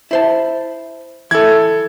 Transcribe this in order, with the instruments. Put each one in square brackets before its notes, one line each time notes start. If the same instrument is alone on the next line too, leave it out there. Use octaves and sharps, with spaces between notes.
[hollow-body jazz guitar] E4 C5 A5
[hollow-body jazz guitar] E3 E4 [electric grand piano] A4 G#6